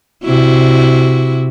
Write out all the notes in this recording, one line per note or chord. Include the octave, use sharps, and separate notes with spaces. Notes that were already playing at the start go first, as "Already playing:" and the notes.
C3 E4 F#4